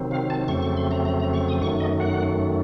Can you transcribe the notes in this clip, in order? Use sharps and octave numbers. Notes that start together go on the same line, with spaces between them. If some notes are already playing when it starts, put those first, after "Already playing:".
Already playing: C3 D#3 F#3 C4
F5
A5
F2 C#3 F#3 A3 C4 C#6
C#6
C6
A#5
A#5
A#5
C#6
D#6
F#2 D#3 F#3 A3 C#6
D#5
F#5